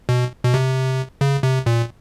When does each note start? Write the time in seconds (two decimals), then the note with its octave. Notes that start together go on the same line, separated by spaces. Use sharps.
0.09 B2
0.45 B2
0.54 C3
1.21 C#3
1.43 C3
1.66 A#2